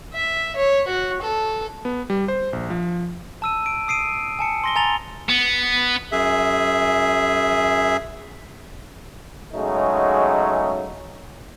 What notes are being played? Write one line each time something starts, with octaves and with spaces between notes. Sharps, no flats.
E5
C#5
F#4
A4
B3
G3
C5
A#1
F3
A5 E6 D#7
D7
D#6 C7 D7 D#7
G#5 A5 C#7
C6 A#6 G7
G#5 A#5 A6 F7 G7
B3
F#2 G#4 E5
C#3 F#3 G#3 A3 D#4